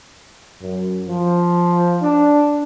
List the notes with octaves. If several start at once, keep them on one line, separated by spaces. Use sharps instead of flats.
F#2
F3
D4